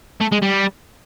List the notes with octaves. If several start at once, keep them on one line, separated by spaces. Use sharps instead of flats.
A3
G#3
G3